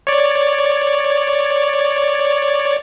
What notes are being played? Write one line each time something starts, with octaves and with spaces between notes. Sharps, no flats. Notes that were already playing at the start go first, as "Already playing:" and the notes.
C#5 D5